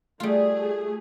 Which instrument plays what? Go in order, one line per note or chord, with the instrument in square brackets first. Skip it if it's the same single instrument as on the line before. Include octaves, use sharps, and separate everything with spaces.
[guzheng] G3 F4 [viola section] A3 G#4